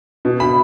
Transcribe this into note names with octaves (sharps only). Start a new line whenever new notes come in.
B2
B5